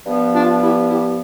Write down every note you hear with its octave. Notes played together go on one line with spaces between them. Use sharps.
G2 F3 B3
D4 F4
E4 G4
E4 G4